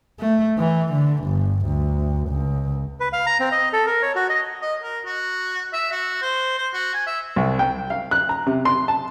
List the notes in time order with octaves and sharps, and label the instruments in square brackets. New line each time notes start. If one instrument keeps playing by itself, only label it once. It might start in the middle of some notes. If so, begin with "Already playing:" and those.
[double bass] A3
E3
D3
G1
D2
C#2
[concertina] B4
F5
A#5
C4
D#5
A4
A#4
C#5
F#4
D#5
[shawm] D#5
A#4
F#4
E5
F#4
C5
C5
F#4
G#5
E5
[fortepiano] C2
G5
F5
F#6
A#5
C3
C6
A5